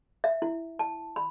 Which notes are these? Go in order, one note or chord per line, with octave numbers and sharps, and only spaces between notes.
E5
E4
A5
B5